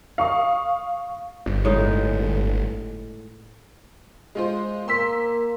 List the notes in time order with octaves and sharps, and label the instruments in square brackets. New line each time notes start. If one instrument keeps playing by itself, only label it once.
[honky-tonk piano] F5 C#6 D#6
[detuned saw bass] G1
[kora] A2 G#3 D#4
[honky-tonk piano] G#3 F4 C5
[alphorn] A#3 [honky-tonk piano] C6 E6 B6